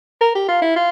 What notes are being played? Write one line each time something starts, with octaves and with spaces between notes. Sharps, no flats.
A#4
G4
F4
E4
F4